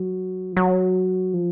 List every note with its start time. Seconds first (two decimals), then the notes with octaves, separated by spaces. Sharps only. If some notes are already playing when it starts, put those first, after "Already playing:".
Already playing: F#3
0.53 F3
0.57 F#3
1.34 F3